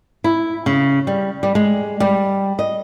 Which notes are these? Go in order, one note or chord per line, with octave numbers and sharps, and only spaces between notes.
E4
C#3
G3
G3
G#3
G3
D#5